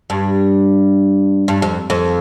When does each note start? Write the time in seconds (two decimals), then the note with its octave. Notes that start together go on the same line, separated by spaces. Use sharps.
0.10 G2
1.48 G2
1.62 F2
1.90 F2